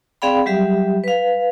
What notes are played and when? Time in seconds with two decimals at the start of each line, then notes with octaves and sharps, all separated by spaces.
0.22 C4 G#4 D5 F5 G5 B5
0.46 F#3 G3 G4 E5
1.04 B4 F5